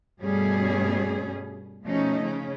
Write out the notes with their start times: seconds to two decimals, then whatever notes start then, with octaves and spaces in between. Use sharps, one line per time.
0.22 G2 B2 G3 A3 C#4 G#4
1.84 B2 F3 A3 C#4 D#4
2.22 C#3 C#4